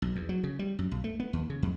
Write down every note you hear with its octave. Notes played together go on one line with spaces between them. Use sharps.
B1
E2
F#3
C#3
G3
F#2
B1
A3
B3
D#2
C#3
F2